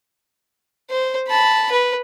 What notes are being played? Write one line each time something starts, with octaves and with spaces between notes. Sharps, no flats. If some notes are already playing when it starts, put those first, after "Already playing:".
C5
A5 B5
B4